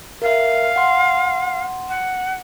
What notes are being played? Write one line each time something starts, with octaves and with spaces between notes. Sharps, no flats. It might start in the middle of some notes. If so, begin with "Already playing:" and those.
A#4 E5 F5
F#5 C6
F#5